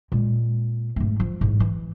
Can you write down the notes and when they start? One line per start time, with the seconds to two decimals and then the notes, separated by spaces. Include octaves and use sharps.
0.12 A#2 G#3
0.96 G#2 A3
1.20 F3
1.41 A1 G#2
1.60 E3